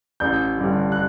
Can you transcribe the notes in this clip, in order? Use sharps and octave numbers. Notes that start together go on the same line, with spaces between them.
A1 G6
G2 D3 G3
F#6